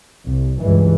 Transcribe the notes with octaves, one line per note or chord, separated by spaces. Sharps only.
C2
C#2 G2 E3